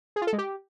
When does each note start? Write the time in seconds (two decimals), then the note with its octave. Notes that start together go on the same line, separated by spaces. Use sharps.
0.16 G#4
0.22 F4
0.27 A4
0.33 G#3
0.38 G4